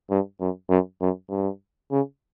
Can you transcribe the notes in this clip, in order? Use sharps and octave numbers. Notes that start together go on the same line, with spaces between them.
G2
F#2
F#2
F#2
G2
C#3